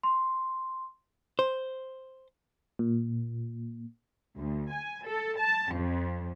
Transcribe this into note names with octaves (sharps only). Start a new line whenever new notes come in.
C6
C5
A#2
D2
G#5
A4
A5
F2